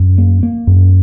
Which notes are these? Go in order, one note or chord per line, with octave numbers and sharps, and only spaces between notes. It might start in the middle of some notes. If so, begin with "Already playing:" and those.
Already playing: F#2
A#3
A#3
F#2